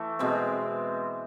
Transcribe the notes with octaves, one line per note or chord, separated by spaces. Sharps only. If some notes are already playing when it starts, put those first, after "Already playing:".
Already playing: E3 A3
B2 G#3 C4